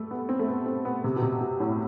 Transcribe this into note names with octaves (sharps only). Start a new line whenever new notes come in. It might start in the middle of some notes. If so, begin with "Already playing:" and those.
Already playing: G3 A3
B3
C4
A3
B3
C4
B3
C3
B2
C3
B2
A2